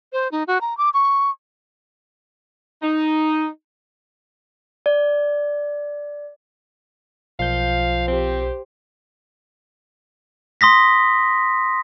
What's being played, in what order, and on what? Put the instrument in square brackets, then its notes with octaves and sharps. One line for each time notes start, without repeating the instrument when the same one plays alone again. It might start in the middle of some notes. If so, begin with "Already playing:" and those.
[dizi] C5
D#4
F#4
A#5
D6
C#6
[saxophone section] D#4
[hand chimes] D5
[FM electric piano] B1 G6 [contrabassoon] F3 [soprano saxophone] F5
[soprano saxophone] C4 [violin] G4 C5
[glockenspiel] C6 D#6 A#6 B6